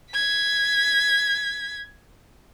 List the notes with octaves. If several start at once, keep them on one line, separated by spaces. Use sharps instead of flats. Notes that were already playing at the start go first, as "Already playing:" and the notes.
G#6 B6